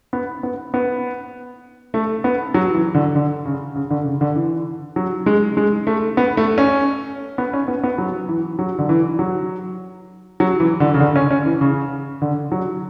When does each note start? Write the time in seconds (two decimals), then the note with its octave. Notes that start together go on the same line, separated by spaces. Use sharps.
0.13 B3
0.43 B3
0.74 B3
1.94 A3
2.24 B3
2.54 F#3
2.75 E3
2.95 D3
3.15 D3
3.45 C#3
3.76 C#3
3.90 D3
4.06 C#3
4.21 D3
4.36 E3
4.96 F#3
5.26 G#3
5.57 G#3
5.87 A3
6.17 B3
6.37 A3
6.58 C#4
7.38 B3
7.53 C#4
7.68 B3
7.84 B3
7.98 F#3
8.29 E3
8.59 F#3
8.78 D3
8.89 E3
9.19 F#3
10.40 F#3
10.60 E3
10.80 D3
10.94 C#3
11.00 D3
11.16 C#4
11.31 C#4
11.46 E3
11.61 C#3
12.22 D3
12.52 F#3